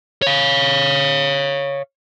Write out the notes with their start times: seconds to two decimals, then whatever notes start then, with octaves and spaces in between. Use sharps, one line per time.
0.22 C#5 F5